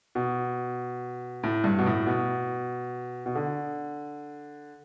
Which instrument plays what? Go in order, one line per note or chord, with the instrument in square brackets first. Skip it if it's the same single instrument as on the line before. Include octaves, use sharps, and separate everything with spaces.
[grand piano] B2
A2
G2
B2
A2
B2
B2
D3